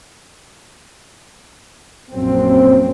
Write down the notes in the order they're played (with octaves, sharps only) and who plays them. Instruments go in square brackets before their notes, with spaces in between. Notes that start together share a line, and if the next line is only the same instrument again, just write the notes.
[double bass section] A#1 F#2 C4